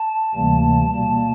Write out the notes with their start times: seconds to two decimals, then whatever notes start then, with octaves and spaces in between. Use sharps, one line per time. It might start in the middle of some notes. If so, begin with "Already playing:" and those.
Already playing: A5
0.34 D2 C3 E3 G3 A#3
0.94 B2 G3 A#3 A5